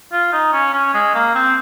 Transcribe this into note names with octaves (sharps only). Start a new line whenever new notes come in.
F4
D#4
C#4
C#4
G#3
A#3
C4